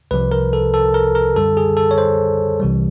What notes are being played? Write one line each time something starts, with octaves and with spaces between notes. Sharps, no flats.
C2 C3 F3 B4
A#4
A4
A4
A#4
A#4
F#2 D3 G3 A4
G#4
A4
C#5
C5
C2 C3 E3 G3